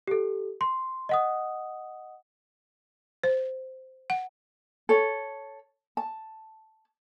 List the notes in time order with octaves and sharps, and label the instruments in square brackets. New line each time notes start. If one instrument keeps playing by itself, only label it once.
[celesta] G4 A4
C6
D#5 F#5 D#6
[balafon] C5
F#5
[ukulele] A4 C#5
A5